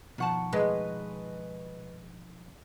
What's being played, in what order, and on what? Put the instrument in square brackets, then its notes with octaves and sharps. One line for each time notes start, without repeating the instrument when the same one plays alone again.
[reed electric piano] B2 F3 C#6 [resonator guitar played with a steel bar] D#3 F#5 A5
[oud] G#3 [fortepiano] B4 D#5